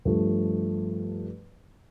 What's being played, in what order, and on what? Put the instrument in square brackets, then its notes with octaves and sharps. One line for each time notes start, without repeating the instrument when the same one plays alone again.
[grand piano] G2 F3 A3